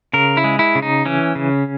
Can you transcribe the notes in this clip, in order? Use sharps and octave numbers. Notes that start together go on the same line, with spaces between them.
C#3 A#4
E4
G#3
E4
C#3
D#4
E3 C#4
C#3